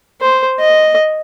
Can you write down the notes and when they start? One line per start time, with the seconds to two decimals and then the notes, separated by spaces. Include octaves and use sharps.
0.21 C5
0.60 D#5